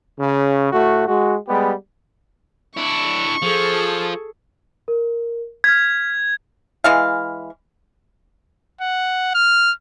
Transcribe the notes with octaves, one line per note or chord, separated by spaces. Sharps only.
C#3
A2 A3 F#4
G#3 F#4
G3 G#3 B3 G4
D4 E4 C#6
F3 G#4 A4
A#4
F6 G#6 B6
E3 G#3 F5
F#5
F6